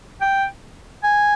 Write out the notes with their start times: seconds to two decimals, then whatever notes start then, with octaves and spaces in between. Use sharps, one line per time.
0.21 G5
1.03 G#5